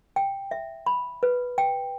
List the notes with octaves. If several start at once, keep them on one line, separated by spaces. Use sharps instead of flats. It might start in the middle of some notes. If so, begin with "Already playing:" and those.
G5
E5
B5
B4
G5